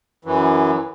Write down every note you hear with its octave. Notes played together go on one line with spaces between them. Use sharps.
F#2 E3